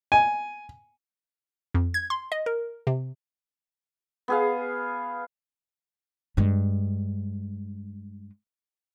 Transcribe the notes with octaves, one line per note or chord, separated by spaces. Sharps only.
G#5
F2
G#6
C6
D#5
A#4
C3
B3 G#4 F5
G2 G#3